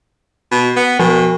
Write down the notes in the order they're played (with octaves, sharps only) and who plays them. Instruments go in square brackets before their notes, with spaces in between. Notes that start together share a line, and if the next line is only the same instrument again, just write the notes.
[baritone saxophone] B2
B3
[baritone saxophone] B2 [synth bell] F3